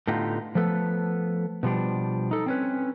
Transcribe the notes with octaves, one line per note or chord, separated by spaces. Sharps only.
A2 D3 B3 D#4 F4 G4
F3 A3 B3 A4 B4
B2 F3 G3 D4
D#4 A4
C4 C#4 B4